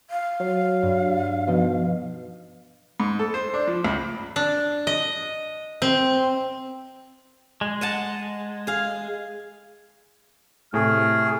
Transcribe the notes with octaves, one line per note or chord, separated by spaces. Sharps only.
F5
F#3
G2
B2 F3 D#4
G#2
A4
C5
D4
F3
C#2
D4
D#5
C4
G#3
D#5 F#5 A5
G#4 F5
A2 C3 A3 G#4 F6